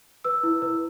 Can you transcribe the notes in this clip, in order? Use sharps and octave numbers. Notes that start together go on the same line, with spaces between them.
B4 E6
E4
B4